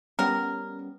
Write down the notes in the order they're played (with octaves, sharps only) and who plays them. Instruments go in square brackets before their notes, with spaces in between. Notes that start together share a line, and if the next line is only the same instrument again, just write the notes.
[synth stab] G3 B3 C#4 [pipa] A#4